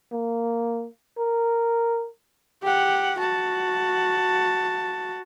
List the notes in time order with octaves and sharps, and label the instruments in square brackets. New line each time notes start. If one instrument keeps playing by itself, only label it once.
[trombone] A#3
A#4
[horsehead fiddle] G4 F#5
F#4 A5